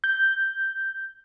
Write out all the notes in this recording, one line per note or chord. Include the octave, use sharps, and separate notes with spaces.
G6